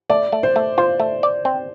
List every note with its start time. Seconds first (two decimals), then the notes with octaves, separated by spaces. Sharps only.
0.10 A3 D5
0.32 A3
0.43 C5
0.56 A3
0.78 F4 C5
1.00 A3
1.23 D5
1.45 C4